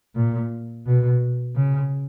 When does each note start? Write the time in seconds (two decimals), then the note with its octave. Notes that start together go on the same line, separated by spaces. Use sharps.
0.15 A#2
0.86 B2
1.56 C#3